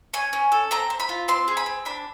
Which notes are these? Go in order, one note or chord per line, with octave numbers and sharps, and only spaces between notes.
C#4 G#5
C#4
A4
C4 A#5
C4
B5
F4
C4 C6
G#4
B5
C4
D4 B5